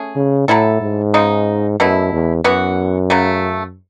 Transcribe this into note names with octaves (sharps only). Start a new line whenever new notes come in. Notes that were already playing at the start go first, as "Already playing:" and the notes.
Already playing: A3 C#4 G#4
C#3
A2 F#3 A3 E4 A4
G#2
C#3 G#3 D#4
F#2 B2 A3 E4
E2
F#2 E3 B3 F#4
C#3 F#3 A3